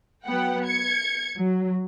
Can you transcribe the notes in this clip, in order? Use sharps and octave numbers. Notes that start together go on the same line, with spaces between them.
F#3 B3 F#5 G5
G#6 C#7
F#3